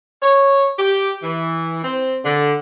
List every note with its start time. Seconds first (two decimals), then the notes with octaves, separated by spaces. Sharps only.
0.23 C#5
0.79 G4
1.23 E3
1.84 C4
2.25 D3